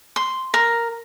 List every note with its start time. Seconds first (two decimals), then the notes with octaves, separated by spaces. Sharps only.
0.16 C6
0.54 A#4